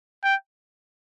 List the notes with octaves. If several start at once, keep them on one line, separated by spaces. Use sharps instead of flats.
G5